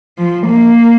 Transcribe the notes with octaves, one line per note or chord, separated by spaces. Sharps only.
F3
A#3